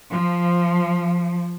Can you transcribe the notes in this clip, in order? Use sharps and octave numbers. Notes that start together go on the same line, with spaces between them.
F3